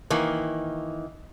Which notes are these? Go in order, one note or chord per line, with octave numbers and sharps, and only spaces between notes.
D#3 E3 A#3